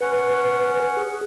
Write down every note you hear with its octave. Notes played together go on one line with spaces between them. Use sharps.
C#4 B4 F#5
G#4